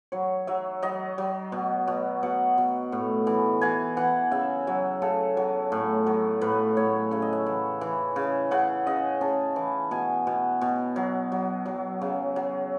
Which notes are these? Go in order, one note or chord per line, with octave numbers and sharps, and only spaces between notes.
F#3 C#5
F#3 E5
F#3 D#5
F#3
B2
B2
B2 F#5
B2
A2
E3
E3 G#5
E3 F#5
C#3 E5
F#3 E5
C#3 A4
F#3
A2
F#3
A2 B4
A2 C#5
C#3 E5
D#5
E5
E3
E3
C#3
C#3 F#5
C#3 D#5
C#3 A5
E3
B2 G#5
B2
B2
F#3
F#3
F#3
C#3
F#3